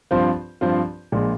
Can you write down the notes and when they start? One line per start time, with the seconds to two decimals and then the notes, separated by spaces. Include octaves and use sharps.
0.11 G2 F3 C4 F4 C5
0.61 G2 F3 C4 F4 C5
1.12 A#1 A#2 G#3